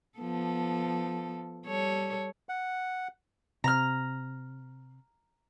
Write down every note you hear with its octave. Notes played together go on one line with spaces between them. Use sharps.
F3 B3 A4
G3 A4 C#5
F#5
C3 A#5 F6